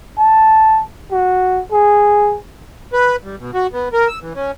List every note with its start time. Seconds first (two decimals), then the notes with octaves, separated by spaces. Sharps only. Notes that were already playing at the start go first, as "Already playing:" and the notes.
0.18 A5
1.12 F#4
1.72 G#4
2.93 B4
3.24 G3
3.39 B2
3.54 F#4
3.73 B3
3.93 A#4
4.08 E6
4.21 E3
4.35 C#4